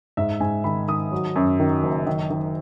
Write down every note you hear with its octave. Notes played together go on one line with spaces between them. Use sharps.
G#2 E5
G#2 G#5
D#3 B5
D#3 D#6
F#3
F#2
D#3
F#1
D#3
D#3